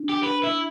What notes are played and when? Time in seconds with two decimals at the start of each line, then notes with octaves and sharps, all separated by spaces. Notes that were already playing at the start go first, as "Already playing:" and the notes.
Already playing: D4
0.09 G4
0.23 B4
0.43 E4